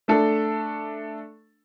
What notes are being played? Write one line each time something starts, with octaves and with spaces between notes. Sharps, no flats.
A3 D4 A4